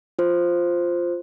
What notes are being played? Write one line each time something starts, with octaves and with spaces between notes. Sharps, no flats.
F4 C5